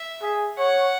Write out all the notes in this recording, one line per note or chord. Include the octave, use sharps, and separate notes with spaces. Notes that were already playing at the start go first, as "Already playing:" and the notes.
Already playing: E5
G#4
C#5 F#5